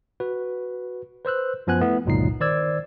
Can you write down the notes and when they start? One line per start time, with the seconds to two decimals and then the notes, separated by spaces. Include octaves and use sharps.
0.20 F#4 B4
1.25 B4 C5 E6 F#6
1.67 F#2 F3 B3 G#5 F#6
1.80 A3 B3 E4
2.06 G1 C#2 A#2 F#3 D#4 C7
2.40 D#3 C5 D5 E6 G#6